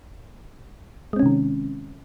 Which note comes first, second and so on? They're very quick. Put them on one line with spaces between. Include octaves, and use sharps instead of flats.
G#3 C4 C#4 C3 D#3